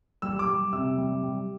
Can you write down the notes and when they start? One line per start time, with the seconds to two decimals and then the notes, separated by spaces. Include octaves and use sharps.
0.22 G3 E6
0.39 D6
0.48 G3
0.73 C3 E6
0.98 G3
1.23 G3